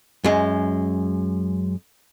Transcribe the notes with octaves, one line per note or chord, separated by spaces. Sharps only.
F#2 G#3